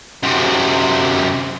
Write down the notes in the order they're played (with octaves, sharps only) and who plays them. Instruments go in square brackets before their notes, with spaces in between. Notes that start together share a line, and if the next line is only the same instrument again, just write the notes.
[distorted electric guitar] F#2 C3